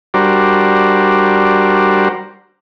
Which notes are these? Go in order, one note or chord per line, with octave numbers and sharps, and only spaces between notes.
G3 D4 F#4 A#4 C5